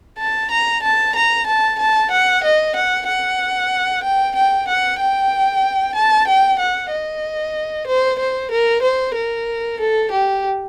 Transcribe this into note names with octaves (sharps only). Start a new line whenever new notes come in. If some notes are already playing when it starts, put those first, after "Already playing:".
A5
A#5
A5
A#5
A5
A5
F#5
D#5
F#5
F#5
G5
G5
F#5
G5
A5
G5
F#5
D#5
C5
C5
A#4
C5
A#4
A4
G4